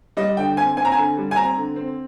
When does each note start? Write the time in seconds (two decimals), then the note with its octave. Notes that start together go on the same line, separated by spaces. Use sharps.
0.17 G3 D#5
0.37 D3 G5
0.57 C4 G#5
0.77 C4 G#5
0.85 A#5
0.92 D3 G#5
1.17 G3
1.31 G#5
1.36 C4 A#5
1.57 D3
1.76 C4